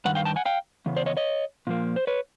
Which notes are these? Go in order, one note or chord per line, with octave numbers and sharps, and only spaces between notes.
G2 D#3 F#5
F5 G5
G5 A5
F#5 G#5
F5 G5
E2 C#3
C5 D5
C#5 D#5
C#5 D#5
A#2 F3 A#3
C5
B4 C#5